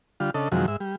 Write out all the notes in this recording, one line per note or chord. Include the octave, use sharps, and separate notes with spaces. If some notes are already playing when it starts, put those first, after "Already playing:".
D3 G3 F4
C#3 D4 A4 D#5
F#2 C3 D#3 F3 F#3 G#3
G#2 E5
G3